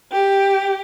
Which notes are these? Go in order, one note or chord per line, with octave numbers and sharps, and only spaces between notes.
G4